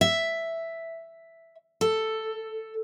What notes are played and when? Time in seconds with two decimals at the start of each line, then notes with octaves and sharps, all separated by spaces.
0.01 E5
1.81 A4